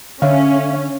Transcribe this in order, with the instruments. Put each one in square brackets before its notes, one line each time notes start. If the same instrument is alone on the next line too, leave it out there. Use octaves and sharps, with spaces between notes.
[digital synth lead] D3 [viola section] C#4 [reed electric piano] C#5 E5 F5